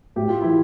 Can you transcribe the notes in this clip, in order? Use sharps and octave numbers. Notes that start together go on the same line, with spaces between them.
A2 G4
F4
E3 E4